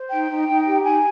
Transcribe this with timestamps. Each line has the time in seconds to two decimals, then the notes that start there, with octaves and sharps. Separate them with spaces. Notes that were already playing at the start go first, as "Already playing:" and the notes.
Already playing: C5
0.10 D#4 G5
0.30 D#4
0.48 D#4
0.67 G4
0.84 D#4 G#5